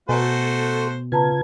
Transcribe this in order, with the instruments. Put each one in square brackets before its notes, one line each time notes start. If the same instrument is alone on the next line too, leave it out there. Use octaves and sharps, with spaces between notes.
[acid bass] B2 [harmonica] A3 F#4 C5 [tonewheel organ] A4 [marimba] G#5 A#5
[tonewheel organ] C#3 F4 G#6 [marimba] B4 A5 A#5